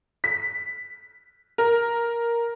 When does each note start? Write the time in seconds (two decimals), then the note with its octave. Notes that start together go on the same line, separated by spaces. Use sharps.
0.24 B6
1.58 A#4